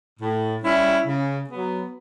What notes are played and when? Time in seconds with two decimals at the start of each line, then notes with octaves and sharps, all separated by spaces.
0.20 A2
0.63 G3 C#4 E4
1.05 C#3
1.49 F#3 B3